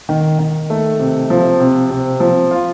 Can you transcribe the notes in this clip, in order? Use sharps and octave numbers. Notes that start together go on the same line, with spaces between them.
D#3
D#3
A3
C3
F3
C3
C3
F3
F4